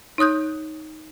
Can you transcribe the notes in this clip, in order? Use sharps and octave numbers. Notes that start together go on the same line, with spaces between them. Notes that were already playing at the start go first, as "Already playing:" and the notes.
D#4 C#5 D#6 F#6 G6